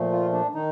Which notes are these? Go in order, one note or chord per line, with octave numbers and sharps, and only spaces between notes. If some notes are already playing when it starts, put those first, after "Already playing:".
Already playing: A#2 F3 A3
F4
D4
D#3 D#4